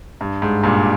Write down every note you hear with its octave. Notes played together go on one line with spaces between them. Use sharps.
G2
G#2
G2 A#2